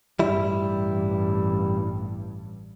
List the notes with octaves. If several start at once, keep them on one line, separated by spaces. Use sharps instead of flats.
A1 G2 G3 E4